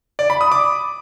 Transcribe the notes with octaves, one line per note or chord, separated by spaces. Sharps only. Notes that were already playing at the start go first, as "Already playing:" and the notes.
D5
B5
D#6
D6